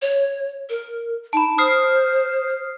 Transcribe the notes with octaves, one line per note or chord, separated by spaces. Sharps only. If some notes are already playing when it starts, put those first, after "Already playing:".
C#5
A#4
D#4 A5 B5
C5 D#6 F6 C7